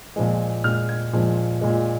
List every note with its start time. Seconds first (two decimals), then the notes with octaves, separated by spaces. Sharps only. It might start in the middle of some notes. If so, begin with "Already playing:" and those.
0.16 A#2 F3 G#3
0.64 A#2 G#3 F6
0.89 G#6
1.13 A#2 F3 G#3
1.61 A#2 G#3